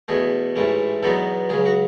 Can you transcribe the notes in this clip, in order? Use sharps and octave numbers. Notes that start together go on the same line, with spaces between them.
E2 B2 A3 G#4
A1 G#2 E3 A3 C#4
E2 B2 F#3 B3 D#4 A4
C#2 C#3 F#3 G#4
F#4